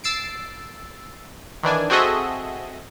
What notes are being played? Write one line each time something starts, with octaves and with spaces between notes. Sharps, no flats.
E6 A6 C7 D7
D#3 E3 D4 G#5
C4 F#4 G#4 A4 D#5 E5